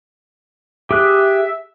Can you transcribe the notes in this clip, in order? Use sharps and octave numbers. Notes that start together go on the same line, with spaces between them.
G4 G#4 E5 F#6